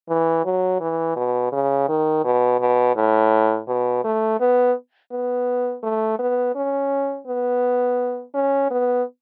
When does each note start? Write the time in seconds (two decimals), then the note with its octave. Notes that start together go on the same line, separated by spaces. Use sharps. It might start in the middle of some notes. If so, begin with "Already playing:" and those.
0.09 E3
0.45 F#3
0.81 E3
1.16 B2
1.52 C#3
1.89 D#3
2.24 B2
2.60 B2
2.96 A2
3.68 B2
4.04 A3
4.40 B3
5.11 B3
5.83 A3
6.19 B3
6.55 C#4
7.27 B3
8.34 C#4
8.70 B3